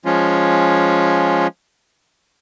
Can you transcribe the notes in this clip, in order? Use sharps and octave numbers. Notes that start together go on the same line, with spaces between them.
F3 G#3 C#4 F4